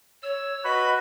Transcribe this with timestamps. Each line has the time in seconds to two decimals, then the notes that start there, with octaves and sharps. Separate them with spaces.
0.23 C#5 E6
0.64 F#4 B4 D#5 B5